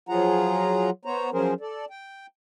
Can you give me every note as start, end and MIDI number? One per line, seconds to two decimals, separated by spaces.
0.09 0.90 53
0.09 0.90 54
0.09 0.90 65
0.09 0.90 68
0.09 0.90 78
0.09 0.90 82
1.05 1.30 59
1.05 1.30 72
1.05 1.30 73
1.05 1.30 82
1.33 1.54 53
1.33 1.54 54
1.33 1.54 61
1.33 1.54 68
1.33 1.54 70
1.33 1.54 72
1.60 1.85 69
1.60 1.85 74
1.90 2.26 79